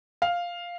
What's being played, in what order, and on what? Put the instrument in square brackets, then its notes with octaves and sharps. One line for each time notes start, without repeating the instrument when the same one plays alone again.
[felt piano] F5